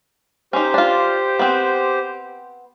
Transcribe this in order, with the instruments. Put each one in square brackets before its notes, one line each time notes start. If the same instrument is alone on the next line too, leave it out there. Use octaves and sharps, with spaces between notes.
[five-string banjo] C#4 D#4 [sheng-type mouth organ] G4 C5
[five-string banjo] D4 F4
B3 C4